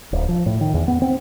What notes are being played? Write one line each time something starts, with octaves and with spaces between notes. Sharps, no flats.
D1
F3
A2
D#3
E2
B3
C4